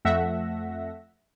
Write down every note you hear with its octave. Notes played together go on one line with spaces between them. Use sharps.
F2 A3 E5 F#5 A#6